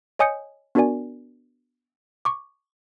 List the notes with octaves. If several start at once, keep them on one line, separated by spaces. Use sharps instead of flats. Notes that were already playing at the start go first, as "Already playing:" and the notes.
C#5 D#5 G#5 D#6 G6 C#7
B3 D4 F#4 A#4 D5 G#5
C#6 D6